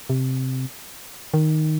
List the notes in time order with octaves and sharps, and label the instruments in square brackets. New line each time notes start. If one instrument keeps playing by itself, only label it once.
[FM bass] C3
D#3